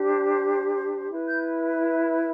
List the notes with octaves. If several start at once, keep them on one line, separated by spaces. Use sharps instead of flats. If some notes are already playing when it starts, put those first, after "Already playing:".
Already playing: D4 G4 C5
E4 B4
G6